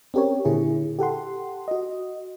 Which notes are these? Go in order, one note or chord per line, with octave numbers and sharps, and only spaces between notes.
C4 C#4 G4 A#4 C#5
A#2 D3 E4 G#4
G4 A4 F#5 C6
F#4 D#5